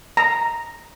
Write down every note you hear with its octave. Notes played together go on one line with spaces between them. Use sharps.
A#5